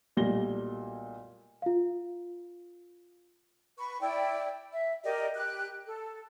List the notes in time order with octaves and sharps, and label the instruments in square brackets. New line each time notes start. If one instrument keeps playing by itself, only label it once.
[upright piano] B1 A#2 G3 A3 A#6 G7
[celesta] F4 F5
[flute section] B4 C#6
E4 D5 G5
E5
G4 A#4 D5 D#5
G4 F#6
A4